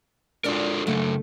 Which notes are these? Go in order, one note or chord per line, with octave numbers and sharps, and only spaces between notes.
G#2 D4 F4 A4 A#4 D5
C#3 F#3 A3